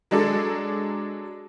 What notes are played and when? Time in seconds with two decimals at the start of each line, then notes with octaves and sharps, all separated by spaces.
0.11 F#3 G#3 D4 A4